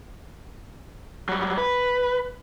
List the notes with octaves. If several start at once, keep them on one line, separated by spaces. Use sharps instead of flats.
F#3 G3
B4